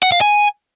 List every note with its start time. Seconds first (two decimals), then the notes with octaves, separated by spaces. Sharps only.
0.03 F#5
0.12 F5
0.21 G#5